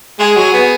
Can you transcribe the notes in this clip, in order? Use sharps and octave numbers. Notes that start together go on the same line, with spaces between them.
G#3 G#4
F#3
B3